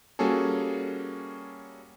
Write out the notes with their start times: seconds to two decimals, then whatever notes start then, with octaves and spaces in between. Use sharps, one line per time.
0.19 G3 A#3 C#4 F#4 G#4 A4